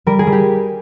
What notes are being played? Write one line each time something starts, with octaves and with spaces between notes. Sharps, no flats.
G3 A#4
G#4
G3
G4